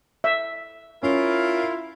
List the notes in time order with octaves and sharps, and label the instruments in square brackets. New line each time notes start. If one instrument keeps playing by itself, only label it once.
[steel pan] E5
[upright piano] C#4 [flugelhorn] E4 [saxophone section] F4 A#4